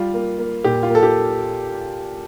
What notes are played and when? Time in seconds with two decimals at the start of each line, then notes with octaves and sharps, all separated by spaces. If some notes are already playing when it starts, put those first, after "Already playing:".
Already playing: G3 F4
0.14 A#3
0.39 A#3
0.64 A#2 G4
0.83 F4
0.90 A#3 A4
1.03 G4